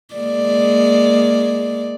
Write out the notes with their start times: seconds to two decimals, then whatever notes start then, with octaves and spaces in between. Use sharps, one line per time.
0.15 G#3 A#3 D5